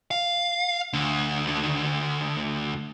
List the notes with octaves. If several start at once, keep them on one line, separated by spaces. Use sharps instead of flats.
F5
D2 D3